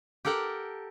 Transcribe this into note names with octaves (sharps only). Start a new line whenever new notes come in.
G4 A4 A#4 F#5 G5